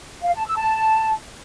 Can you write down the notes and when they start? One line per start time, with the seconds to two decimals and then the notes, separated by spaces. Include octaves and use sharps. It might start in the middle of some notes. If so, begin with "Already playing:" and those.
0.23 F5
0.34 A5
0.45 E6
0.57 A5